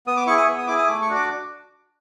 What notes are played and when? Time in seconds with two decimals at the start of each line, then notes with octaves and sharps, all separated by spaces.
0.07 B3 D#6
0.17 D6
0.27 E4 C#6
0.30 G#4
0.38 D#6
0.48 B3
0.58 D#6
0.67 E4 G#4 D6
0.78 D#6
0.87 A3 D6
1.02 C#6
1.09 D4 F#4
1.16 D6